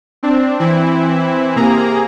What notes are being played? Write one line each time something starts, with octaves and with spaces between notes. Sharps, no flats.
C4 D4
E3 C4 E4
C3 A#3 G#4 A#5